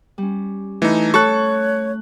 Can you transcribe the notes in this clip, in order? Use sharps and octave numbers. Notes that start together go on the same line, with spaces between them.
G3 C#4
E3 A3 D#4
A4 C#5 A5 C#6 F#6